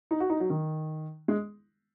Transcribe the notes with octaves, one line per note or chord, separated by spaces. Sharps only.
D#4
F#4
D#4
F#3
D#3
G#3